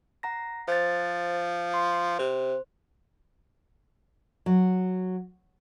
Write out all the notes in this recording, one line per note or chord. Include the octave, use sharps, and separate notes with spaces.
F#5 A#5 A#6
F3 C5 A6
C6
C3 C5
F#3